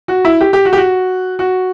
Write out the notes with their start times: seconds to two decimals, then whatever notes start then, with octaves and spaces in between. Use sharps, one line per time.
0.08 F#4
0.25 E4
0.41 G4
0.53 G4
0.65 F#4
0.73 G4
0.77 F#4
1.39 F#4